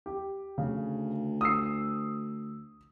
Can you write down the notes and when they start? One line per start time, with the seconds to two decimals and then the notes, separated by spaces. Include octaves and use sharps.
0.06 G4
0.58 D2 C#3
1.41 D#6 E6 C7